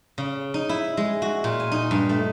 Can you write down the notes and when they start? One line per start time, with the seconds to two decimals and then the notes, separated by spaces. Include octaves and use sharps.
0.18 C#3
0.54 D#4
0.69 E4
0.97 G#3
1.22 F#4
1.44 A#2
1.60 G#5
1.72 D#4
1.91 G2
2.09 A3